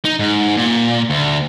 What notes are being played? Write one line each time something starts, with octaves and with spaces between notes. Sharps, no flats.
D#4
G#2
A#2
D2